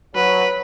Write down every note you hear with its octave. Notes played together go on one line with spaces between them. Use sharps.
F#3 B4